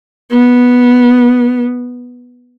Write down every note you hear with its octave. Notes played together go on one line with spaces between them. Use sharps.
B3